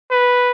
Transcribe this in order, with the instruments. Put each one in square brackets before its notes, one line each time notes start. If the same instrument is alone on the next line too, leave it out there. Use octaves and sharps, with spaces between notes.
[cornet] B4